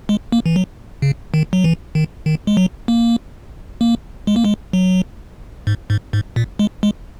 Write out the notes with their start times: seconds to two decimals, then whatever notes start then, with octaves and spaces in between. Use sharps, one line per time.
0.09 G#3
0.32 A#3
0.46 E3
0.56 F#3
1.02 C#3
1.34 D#3
1.53 F#3
1.64 E3
1.95 D#3
2.26 D#3
2.47 G#3
2.57 F#3
2.88 A#3
3.81 A#3
4.27 G#3
4.36 A#3
4.44 G#3
4.73 F#3
5.67 G#2
5.90 G#2
6.13 G#2
6.36 A#2
6.59 G#3
6.83 G#3